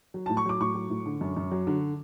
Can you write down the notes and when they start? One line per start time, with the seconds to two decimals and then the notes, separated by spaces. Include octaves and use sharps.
0.14 F#3
0.26 A2 A5
0.37 C#6
0.46 F#3 D6
0.60 A2 C#6
0.75 F#3
0.90 A2
1.06 D3
1.21 F#2
1.37 F#2
1.52 F#3
1.67 D3